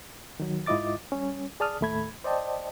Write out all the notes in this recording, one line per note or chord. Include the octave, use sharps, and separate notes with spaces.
D#3 F#3
G#2 E4 F4 D#5 D6 A6
G3 C#4
G#4 D5 A5 D#6 F6
D#2 A2 A3 B5 G#6
C5 D5 D#5 G5 A5